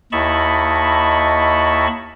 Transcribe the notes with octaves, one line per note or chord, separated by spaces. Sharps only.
D#2 E4 D#5 A5 B5 C#6